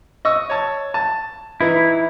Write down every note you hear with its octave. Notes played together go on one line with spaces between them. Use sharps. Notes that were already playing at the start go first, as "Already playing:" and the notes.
D#5 C#6 E6
C#5 A5
A5
E3 D#4 E4